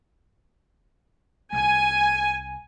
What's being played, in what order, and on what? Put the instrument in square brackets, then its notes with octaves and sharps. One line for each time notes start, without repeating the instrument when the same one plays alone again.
[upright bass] C2 [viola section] G#5